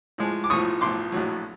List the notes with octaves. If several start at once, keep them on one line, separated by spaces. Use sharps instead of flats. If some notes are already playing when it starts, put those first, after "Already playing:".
A2 F3 G#3
D6
B1 A2 F3 C#6 D#6
B1 A2 F3 C6 D6
A#1 A2 F#3